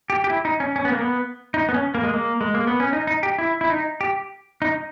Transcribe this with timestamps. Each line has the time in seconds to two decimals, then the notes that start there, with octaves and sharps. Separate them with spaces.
0.10 G4
0.24 G4
0.30 E4
0.45 D#4
0.60 C#4
0.76 C#4
0.85 B3
0.92 A#3
1.01 B3
1.54 D#4
1.69 B3
1.74 C#4
1.95 A#3
2.03 G#3
2.13 A#3
2.41 G#3
2.54 A#3
2.67 B3
2.80 C#4
2.93 D#4
3.07 D#4
3.23 G4
3.38 E4
3.61 E4
3.70 D#4
4.01 G4
4.62 D#4